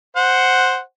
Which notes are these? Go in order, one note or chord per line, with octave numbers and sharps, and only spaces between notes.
C5 F#5